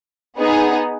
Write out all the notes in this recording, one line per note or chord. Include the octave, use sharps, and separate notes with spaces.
B3 D#4 G#4